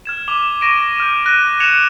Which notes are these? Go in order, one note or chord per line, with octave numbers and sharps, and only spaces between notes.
F6 G#6 E7
D6 D#7 F7 G7
C#6 A#6 D7 D#7
F6 G6
F#6 A#6 D#7
G#6 C#7 E7 F7